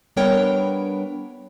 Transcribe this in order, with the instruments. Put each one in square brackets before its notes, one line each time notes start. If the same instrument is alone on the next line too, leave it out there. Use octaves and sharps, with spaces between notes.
[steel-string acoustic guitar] G3 B3 D4 A#4 C#5 G5